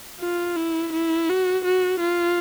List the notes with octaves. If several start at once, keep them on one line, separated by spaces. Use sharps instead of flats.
F4
E4
E4
F#4
F#4
F4